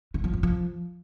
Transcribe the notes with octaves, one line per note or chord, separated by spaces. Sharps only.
D3
F3
F2
F3